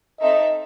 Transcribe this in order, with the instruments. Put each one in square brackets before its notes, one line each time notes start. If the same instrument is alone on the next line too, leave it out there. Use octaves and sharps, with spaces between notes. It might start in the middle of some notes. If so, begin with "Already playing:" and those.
[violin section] C4 D#4 A4 E5 [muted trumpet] D#5